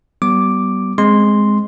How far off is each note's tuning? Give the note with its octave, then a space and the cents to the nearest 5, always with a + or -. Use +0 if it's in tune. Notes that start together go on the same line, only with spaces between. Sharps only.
G3 -35 B3 +0 D6 +0
G#3 +0 C4 +10 C6 +0